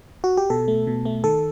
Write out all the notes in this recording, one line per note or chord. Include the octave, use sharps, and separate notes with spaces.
F#4
G4
B2 A4
A3
B2
A3
D#3 A4